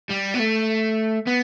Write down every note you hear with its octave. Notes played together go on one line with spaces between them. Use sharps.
G3
B3
A3
B3